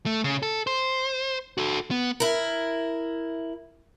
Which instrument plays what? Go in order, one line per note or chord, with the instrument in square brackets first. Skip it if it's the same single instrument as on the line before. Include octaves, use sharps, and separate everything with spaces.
[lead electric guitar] A3
C#3
A4
C5
F#4 A4
B3
[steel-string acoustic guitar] E4 A#4